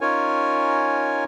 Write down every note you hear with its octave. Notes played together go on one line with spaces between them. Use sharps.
C#4 D#4 F4 A#4 C#5 G#5